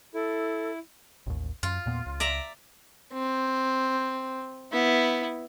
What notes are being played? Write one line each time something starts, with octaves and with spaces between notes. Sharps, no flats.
E4 A4
A1 D#2
F#2 F4
E2 A#2 B3
C#2
D5 E5 A#5
C4
B3 E4